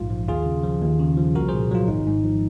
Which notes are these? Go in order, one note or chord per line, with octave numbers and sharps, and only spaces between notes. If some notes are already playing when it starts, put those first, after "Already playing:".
Already playing: A#1 G#2 F4
F3
D#2 F4 G#4
C#3
F3
D#2
C#3
F3
C2 F#4 A#4
G#4 C5
A#2
F#3 F4
G#1 D#4
G#2
F3